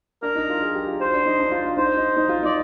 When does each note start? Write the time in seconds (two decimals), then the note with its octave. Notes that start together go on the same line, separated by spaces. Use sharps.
0.23 D4 A#4
0.35 D#4
0.50 F4
0.62 G#4
0.75 G4
0.87 F4
1.00 F4 C5
1.13 D4
1.26 D#4
1.39 D4
1.52 F4
1.66 F4
1.77 D#4 C5
1.97 D#4
2.17 D#4
2.29 F4
2.43 D#4 D5